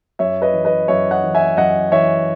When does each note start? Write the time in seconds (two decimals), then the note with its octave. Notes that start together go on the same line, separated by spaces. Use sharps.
0.19 F#2 C#5 E5
0.42 B4 D#5
0.53 E3
0.65 B4 D#5
0.88 F#2 C#5 E5
1.11 D#5 F#5
1.23 E3
1.35 E5 G#5
1.57 F#2 D#5 F#5
1.92 E3 C#5 E5